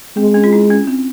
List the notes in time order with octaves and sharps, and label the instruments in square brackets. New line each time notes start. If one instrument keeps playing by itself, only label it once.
[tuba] G#3 [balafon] C4
[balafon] C#4
F4
E4
C#4
C4